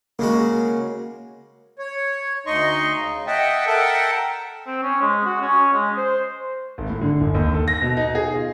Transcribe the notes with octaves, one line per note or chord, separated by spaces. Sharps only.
C#3 G#3 A#3 F#4
C#5
D2 D#4 D#5 C6 C#6
C#3
D#5 E5 F#5 G5 A5
A4 A#4 E5 F#5 G5 A5
C4
C#4
G#3
F#4
C#4
G#3
C5
G#1
A2
D3
G1
D#2
A4
A#6
B2
D#4
G#4
F4